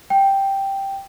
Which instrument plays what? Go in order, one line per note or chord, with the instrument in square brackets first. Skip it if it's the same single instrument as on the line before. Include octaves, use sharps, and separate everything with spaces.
[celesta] G5